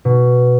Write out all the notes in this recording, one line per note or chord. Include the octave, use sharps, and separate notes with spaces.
B2